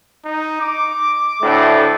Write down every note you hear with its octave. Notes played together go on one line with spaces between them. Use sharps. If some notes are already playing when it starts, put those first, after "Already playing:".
D#4
D6
D2 A2 A3